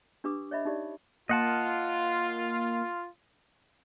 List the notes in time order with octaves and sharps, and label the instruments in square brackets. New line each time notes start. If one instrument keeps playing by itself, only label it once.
[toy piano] D4 G4 B4 D6 D#6
C#5 D#5 E5 B5
D#4 G4 D5
[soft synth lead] A#3 [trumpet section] F4 [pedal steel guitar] D#5 F#5 A5